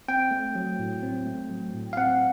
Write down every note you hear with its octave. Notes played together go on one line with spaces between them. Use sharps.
C4 G5
A3
F#3
A2
C4
A3
F#3
A2
F5
C4 F#5